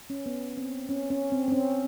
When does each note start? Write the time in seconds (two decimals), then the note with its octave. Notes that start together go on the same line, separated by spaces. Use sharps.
0.10 C#4
0.26 B3
0.57 C4
0.89 C#4
1.10 C#4
1.32 C4
1.48 C4
1.52 C#4